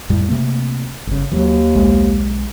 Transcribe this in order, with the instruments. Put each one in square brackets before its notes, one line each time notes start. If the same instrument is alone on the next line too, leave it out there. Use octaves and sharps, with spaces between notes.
[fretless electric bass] F2 A2 G3
C3 A3 A#3
G1 C#3
[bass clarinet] D#2 [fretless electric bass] E3 F#3
[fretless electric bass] B1 G#3